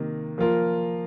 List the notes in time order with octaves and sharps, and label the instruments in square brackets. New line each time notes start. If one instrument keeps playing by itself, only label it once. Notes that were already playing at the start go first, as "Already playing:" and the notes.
Already playing: [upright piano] C3 D#3 A#3
F3 A#3 F4 A#4